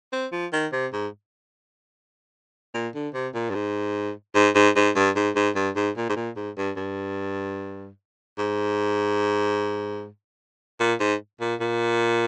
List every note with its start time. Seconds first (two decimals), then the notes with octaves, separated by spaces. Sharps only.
0.12 C4
0.32 F3
0.53 D#3
0.72 C3
0.93 G#2
2.74 A#2
2.95 D3
3.14 C3
3.34 A#2
3.50 G2
3.55 G#2
4.35 G#2
4.55 G#2
4.76 G#2
4.96 G2
5.16 G#2
5.36 G#2
5.55 G2
5.76 G#2
5.97 A#2
6.09 G#2
6.16 A#2
6.36 G#2
6.57 G2
6.76 G2
8.38 G#2
10.80 A#2
11.00 G#2
11.40 A#2
11.60 A#2